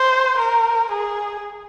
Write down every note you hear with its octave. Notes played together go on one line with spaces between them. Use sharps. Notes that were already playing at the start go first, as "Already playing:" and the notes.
Already playing: C5
A#4
G#4